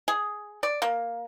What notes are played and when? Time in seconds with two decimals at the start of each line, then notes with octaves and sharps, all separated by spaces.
0.08 G#4
0.63 D5
0.82 A#3